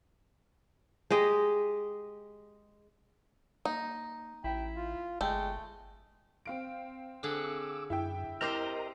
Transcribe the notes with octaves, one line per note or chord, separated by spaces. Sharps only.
G#3 G4 D#5
A#3 D#4
A1 E4 G5
F4
G1 G#3 A3 G5
C4 F5 D7
D3 G#4 F#5 D6 E6
F#2 E4 E5 G5
C4 G4 A#4 C5 D#5 A#5